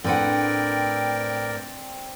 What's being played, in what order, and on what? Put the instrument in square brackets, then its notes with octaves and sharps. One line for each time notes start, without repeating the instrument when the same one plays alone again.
[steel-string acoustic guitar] A2 B4 F#5 [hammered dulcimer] C4 D4 [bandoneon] A#4 D5 G5